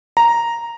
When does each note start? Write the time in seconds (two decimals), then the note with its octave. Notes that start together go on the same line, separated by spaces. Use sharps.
0.17 A#5